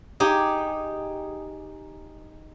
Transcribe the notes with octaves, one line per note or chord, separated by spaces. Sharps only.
D#4 G4 G#4